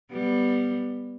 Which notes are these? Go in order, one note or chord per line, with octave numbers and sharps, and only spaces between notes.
G3 B3